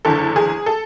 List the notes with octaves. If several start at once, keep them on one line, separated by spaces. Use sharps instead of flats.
F#1 E2 D3 A4
G#4
A4